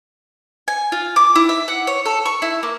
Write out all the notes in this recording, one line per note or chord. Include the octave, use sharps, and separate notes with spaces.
G#5
F4
D6
E4
E5
F#5
C#5
A4
C#6
E4
A#3